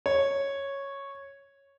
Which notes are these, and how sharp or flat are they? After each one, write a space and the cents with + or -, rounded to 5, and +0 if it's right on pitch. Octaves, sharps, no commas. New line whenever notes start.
C#5 -5